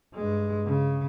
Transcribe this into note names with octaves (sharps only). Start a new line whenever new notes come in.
G2 G#3
C#3